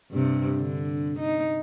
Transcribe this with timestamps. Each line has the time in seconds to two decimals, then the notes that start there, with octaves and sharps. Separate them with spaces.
0.11 G2 C3
0.58 D3
1.20 D#4